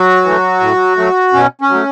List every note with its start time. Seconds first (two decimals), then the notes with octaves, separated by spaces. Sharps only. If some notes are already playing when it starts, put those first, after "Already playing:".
Already playing: F#3 F#4
0.24 E3 A3
0.60 A2
0.96 F#3 A3
1.33 B2 C#4
1.61 C#4
1.69 F#3 A3